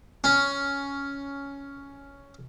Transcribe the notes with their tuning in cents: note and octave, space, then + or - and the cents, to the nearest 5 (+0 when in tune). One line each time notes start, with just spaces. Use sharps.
C#4 +10